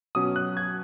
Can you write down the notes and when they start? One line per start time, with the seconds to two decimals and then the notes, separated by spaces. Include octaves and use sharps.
0.15 B2 F#3 C#4 D#6
0.36 F#6
0.57 G#6